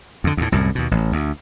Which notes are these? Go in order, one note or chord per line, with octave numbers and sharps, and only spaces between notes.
F2 D3
D#2 A2
C2 F#2 A2
D#2 B2
A1
D2